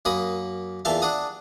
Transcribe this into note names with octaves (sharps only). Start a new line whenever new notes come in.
F#2 A#3 B5 D#6
E2 A#2 A4 E5 F5
D4 F#5 D#6